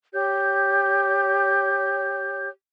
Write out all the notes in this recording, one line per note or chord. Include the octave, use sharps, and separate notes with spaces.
G4 C#5 G6